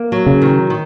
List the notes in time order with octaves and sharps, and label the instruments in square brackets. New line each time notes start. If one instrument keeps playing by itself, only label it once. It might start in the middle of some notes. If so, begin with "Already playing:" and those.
Already playing: [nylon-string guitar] A#3
F#3
[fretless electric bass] C#3
[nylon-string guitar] D#3
D#3